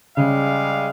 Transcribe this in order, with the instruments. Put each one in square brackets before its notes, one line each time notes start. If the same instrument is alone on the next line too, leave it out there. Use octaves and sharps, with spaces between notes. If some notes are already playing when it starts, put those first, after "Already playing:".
[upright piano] C#3 [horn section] G3 G#3 F5